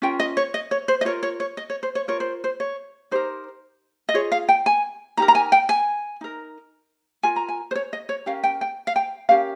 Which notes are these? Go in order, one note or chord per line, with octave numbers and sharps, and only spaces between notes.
C#4 F4 A#4 G5
D#5
C#5
D#5
C#5
C5
D#5
F4 A#4 C#5
C#5
C#5
D#5
C#5
C5
C#5
F4 A#4 C#5
C5
C5
C#5
D#4 G4 A#4 C5
D#5
F4 G#4 C#5
F5
G5
G#5
D#4 G4 A#4 A#5
A#5
G#5
G5
G#5
D#4 A#4
F4 A#4 G#5
A#5
G#5
C5
C#5
D#5
C#5
C#4 G4 A#4 F5
G5
G5
F5
G5
C#4 G4 A#4 F5